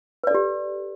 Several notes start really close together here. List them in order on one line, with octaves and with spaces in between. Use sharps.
B4 D5 A4 G4